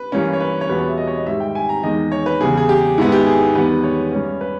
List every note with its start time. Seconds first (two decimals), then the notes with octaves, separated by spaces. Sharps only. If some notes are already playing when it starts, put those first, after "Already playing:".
Already playing: B4
0.12 G2 E3 A#3 C#4
0.33 C#5
0.41 B4
0.61 C#5
0.69 E2 B2 G3 B3 B4
0.79 C#5
0.88 E5
0.98 D#5
1.07 C#5
1.17 D#5
1.26 G#2 D#3 G3 E5
1.40 G5
1.55 G#5
1.69 A#5
1.83 E2 D#3 G#3 D#5
2.12 C#5
2.26 B4
2.41 E2 C#3 G3 G#4
2.57 G#4
2.69 G4
2.98 G#2 D#3 G#3 B3 E4
3.12 G4
3.27 G#4
3.55 E2 D#3 G3 B3 B4
3.83 C#5
4.12 G2 G3 C#4
4.41 B4